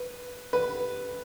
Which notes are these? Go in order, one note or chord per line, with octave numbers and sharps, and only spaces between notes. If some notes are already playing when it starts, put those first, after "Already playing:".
Already playing: B4
B4